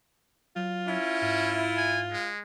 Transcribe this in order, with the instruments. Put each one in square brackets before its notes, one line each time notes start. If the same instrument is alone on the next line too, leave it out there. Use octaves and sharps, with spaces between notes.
[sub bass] F#3 [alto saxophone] F4
[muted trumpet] C#4 [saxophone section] E4
[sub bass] G#2 [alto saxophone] F4
[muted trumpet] G#5
G#3